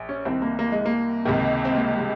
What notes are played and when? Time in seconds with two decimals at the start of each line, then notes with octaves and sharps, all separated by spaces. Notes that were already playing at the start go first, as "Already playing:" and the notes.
Already playing: A#1
0.09 C#4
0.25 C2 C3 D#3 C4
0.42 A#3
0.59 A#3
0.72 G#3
0.86 A#3
1.25 C#2 C3 D#3
1.65 C4
1.75 A#3
1.90 G3
1.99 G#3